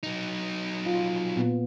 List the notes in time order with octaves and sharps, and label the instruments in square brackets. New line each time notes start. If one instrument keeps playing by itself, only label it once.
[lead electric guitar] F#3 D#4
[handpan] F4
A#2 B3